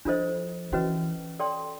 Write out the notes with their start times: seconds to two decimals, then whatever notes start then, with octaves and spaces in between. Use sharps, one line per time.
0.05 F3 D4 F4 A4 C5 D#5
0.72 E3 C#4 F#4 B4 D#5
1.39 A4 D5 G5 C6